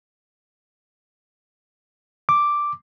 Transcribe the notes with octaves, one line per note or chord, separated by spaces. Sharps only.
D6